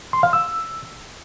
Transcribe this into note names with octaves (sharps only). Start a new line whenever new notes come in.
C6
F5
E6